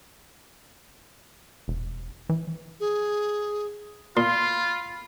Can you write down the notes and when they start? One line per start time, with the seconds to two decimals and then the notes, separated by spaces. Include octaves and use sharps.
1.68 E1
2.29 E3
2.80 G#4
4.17 A#2 F4 B5 C6